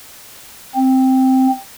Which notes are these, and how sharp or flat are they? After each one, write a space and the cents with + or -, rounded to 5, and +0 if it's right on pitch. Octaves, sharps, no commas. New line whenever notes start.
C4 +0